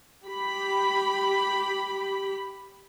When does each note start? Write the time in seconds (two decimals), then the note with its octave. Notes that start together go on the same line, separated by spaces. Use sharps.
0.24 G4 B5